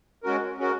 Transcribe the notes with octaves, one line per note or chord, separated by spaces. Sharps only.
G#3 C#4 F#4 A#4
G#3 C#4 F#4 A#4